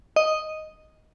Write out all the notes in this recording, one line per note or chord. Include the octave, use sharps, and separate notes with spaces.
D#5